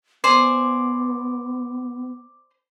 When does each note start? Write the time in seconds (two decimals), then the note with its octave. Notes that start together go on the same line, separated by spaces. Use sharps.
0.24 B3 C5 D5 G#5 D6